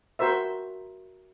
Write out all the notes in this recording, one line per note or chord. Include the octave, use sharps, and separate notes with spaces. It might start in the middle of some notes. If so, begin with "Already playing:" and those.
F#4 A#4 C5 E5